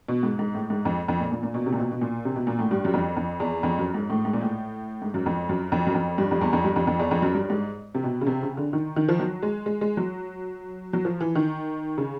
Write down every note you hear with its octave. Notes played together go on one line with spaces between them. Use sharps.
B2
G#2
G#2
A2
G#2
F2
F2
A#2
A#2
A#2
B2
C3
A#2
B2
B2
A#2
C3
B2
A#2
A2
G2
F#2
F2
F2
E2
F2
F#2
G#2
A2
G#2
A#2
A2
G#2
F#2
F2
F#2
F2
F#2
F2
G2
F2
E2
F2
G2
F2
F2
E2
F2
F#2
G2
G#2
C3
B2
C#3
C3
C#3
D3
D#3
D#3
F3
F#3
G#3
G#3
G#3
F#3
F#3
F3
E3
D#3
C#3